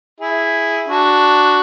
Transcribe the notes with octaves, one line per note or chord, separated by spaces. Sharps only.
E4 G#4
D4 F#4